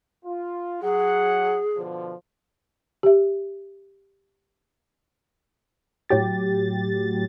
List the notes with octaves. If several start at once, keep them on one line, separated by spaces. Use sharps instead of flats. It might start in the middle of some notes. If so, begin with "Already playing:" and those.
F4
F#3 G#4 F#5
B2 D3 F3
G4 E5
A2 F#3 G4 A6